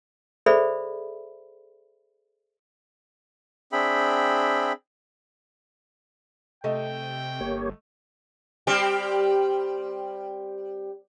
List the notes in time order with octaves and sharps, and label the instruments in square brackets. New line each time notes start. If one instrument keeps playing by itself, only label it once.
[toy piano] G#4 A4 C5 D5 E5 B5
[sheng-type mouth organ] C4 D4 G#4 E5 G5 B5
[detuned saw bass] C3 [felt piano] A3 D#5 [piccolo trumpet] G5
[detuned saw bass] G1 [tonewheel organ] A#3 G4 C#5
[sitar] G3 C4 G4